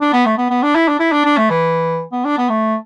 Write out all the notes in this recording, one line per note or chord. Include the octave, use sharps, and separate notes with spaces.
D4
B3
A3
B3
B3
D4
E4
D4
E4
D4
D4
A3
E3
B3
D4
B3
A3